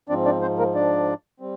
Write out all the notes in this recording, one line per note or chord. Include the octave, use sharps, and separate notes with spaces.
G#2 F3 C4 D4 D5
D4 D5
C4 C5
A#3 A#4
D4 D5
G3 C4